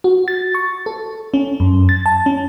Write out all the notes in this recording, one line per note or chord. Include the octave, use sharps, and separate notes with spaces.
F#4
A6
C#6
A4
C#4
F#2
A6
A5
C#4